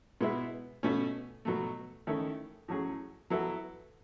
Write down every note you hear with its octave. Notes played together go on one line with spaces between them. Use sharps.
B2 G#3 B3 E4
B2 A3 C#4
B2 F#3 A3
D#3 A3 C#4 E4 A4
A2 F#3 C#4 G#4
F#3 B3 E4 A4